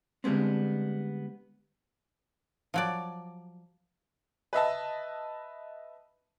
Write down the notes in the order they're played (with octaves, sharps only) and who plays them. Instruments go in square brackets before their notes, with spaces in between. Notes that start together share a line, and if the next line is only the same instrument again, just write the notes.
[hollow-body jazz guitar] D3 G3 G#3 B3 C4
[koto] F3 F#3 D5
[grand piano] B4 D#5 E5 A5